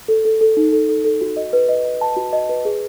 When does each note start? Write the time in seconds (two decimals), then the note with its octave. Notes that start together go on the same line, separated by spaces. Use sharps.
0.08 A4
0.25 A4
0.41 A4
0.57 D#4
0.73 A4
0.89 A4
1.04 A4
1.21 F#4
1.36 D#5
1.53 B4
1.69 D#5
1.85 D#5
2.01 A5
2.17 F#4
2.33 D#5
2.49 B4
2.65 G#4